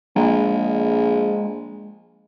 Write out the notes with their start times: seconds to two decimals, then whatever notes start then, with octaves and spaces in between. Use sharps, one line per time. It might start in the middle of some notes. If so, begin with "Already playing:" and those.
0.16 A#1 G#3